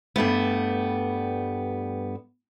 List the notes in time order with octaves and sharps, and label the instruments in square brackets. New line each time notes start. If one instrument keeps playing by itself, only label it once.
[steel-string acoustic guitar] G2 G3 A3 B3